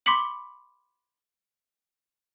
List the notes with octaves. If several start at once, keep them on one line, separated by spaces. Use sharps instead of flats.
B5 C6 D6 B6 C#7 F#7